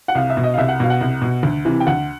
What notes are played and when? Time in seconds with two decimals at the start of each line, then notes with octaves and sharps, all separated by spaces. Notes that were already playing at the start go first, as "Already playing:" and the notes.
0.08 F#5
0.15 C2 F5
0.30 E5
0.37 B2
0.43 D#5
0.54 F5
0.58 C2 E5
0.68 F#5
0.80 B2 F5
0.90 F#5
1.01 C2
1.22 B2
1.43 D2
1.65 C3 E3
1.80 G5
1.87 D2 F#5